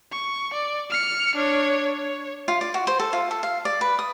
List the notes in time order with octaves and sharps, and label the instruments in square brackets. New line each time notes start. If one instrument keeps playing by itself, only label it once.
[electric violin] C#6
D5
F6 C#7
D4 C#5
C#5
[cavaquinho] F4
D5
F#4
C5
A4
F4
A4
F5
D5
B4
D#6